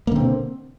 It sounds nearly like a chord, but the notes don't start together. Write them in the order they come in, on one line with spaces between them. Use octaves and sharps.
A#3 D3 C4 B2